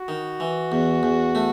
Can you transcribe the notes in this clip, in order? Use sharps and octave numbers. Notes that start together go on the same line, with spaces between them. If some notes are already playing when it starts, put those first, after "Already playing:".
Already playing: F#4
D#3
E3
E2
E2
A3